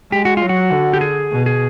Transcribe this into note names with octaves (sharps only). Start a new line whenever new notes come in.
G#3 G4
F#4
F#3 F4
F#4
D3
G4
G#4
B2
G#4